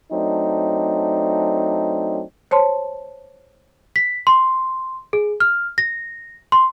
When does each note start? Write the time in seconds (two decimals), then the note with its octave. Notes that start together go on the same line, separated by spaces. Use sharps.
0.12 F#3 A3 C4 D4 D#4
2.51 C5 C#5 A5 C6
3.96 B6
4.27 C6
5.13 G#4
5.40 F6
5.78 A#6
6.52 C6